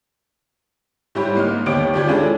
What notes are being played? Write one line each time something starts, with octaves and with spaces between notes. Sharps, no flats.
G#2 G3 E4 G4 C#5
G#2 A#3 D#5 F6
D#2 B3 G4 C#5 D6 D7
D#2 F4 G4 C#5 D5 G#6
G#3 C#4 D4 E4 F4 A4